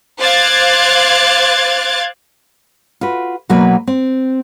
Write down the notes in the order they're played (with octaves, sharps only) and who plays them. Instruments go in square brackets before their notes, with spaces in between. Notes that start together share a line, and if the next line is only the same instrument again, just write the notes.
[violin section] C5 F5 D6 F#6 G#6 A6
[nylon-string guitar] F4 F#4 B4
B2 F#3 A#3 A#4 B4
C4